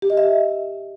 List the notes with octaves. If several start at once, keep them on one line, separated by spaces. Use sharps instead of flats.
G4
D#5
E5